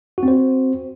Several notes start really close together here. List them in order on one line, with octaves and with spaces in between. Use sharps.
F#4 C4 C5